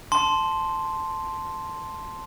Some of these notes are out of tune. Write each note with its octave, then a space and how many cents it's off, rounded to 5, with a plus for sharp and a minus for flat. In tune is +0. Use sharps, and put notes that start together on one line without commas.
A5 +0 C6 +0